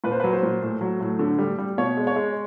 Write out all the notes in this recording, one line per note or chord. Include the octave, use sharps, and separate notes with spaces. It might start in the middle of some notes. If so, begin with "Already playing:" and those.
A#2 B4
C5
F#3 B4
C5
A#2
A2
F#3
A2
D3
G3
G3
B2 C#5
G#3
C#5
G#3